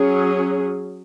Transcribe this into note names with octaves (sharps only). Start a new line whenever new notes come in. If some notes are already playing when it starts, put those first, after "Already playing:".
Already playing: F#3 C#4 G#4